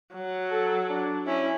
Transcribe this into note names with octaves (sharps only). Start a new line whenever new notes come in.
F#3
A4
D4
C#4 E4